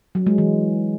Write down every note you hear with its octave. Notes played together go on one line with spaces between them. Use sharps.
F#3
G#3
E3